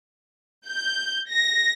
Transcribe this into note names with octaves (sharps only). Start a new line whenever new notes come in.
G6
A#6